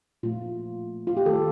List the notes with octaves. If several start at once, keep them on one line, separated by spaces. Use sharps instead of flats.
A#2 F3 A3 F4
F4
G4
D#3 A3 A4